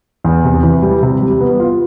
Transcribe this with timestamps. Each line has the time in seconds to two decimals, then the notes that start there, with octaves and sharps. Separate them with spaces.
0.24 E2
0.45 C3
0.63 E3
0.82 G3
1.03 C3
1.22 G3
1.41 B3
1.60 F4